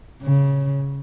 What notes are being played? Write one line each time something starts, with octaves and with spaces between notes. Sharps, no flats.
C#3